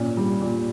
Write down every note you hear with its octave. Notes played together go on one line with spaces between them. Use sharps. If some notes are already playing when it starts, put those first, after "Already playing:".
Already playing: A#2 C#4
G3
A#2